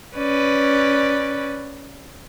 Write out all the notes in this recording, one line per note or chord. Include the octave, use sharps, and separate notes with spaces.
C#4 B4 D5